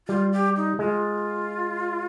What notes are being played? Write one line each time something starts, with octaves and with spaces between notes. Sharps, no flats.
G3 F4
G4
D#4
G#3 F4